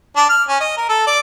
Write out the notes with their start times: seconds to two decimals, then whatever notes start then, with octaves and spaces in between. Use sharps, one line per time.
0.16 D4
0.29 F6
0.49 C#4
0.60 D#5
0.77 A#4
0.89 A4
1.07 D5